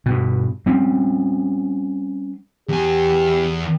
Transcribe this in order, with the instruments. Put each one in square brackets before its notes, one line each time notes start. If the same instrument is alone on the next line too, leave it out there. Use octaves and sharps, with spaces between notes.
[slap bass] G2 B2
G3 C4 C#4
[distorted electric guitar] E2 G#5 [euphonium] G4